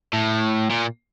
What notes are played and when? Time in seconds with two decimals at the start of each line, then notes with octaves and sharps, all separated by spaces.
0.13 A2
0.71 A#2